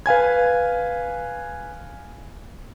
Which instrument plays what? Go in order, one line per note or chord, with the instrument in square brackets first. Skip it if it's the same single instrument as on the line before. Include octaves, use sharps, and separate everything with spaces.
[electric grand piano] B4 F5 G#5 G#6